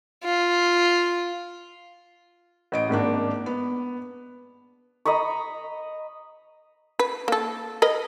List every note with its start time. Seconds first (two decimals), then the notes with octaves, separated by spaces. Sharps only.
0.24 F4
2.72 A1 D#5 D7
2.89 G#1 G#2 A#3 D4
3.46 B3
5.05 D#5 A#5 B5 C#6
6.99 B4
7.28 A#3 A4
7.82 A#4 B4 D#5